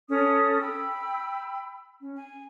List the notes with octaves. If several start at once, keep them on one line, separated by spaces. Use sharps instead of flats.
C#4 A4 D#6
G5 B5 E6
C#4
G#5